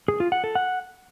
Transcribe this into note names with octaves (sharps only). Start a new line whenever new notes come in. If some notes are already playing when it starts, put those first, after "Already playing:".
G#4
F4
F#5
A4
F#5